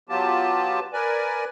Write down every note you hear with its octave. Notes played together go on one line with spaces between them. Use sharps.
F#3 B3 F4 G4 A5
A#4 B4 D5 G#5